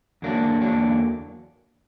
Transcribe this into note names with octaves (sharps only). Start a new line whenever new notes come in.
E2 D3 F#3 A#3 D4
E2 D3 F#3 A#3 D4